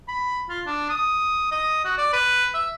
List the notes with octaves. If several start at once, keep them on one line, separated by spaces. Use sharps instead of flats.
B5
F4
D4
D#6
D#5
F#4
D5
B4
E5